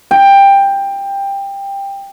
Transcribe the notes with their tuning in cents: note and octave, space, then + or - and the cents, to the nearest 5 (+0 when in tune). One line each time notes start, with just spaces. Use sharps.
G5 +15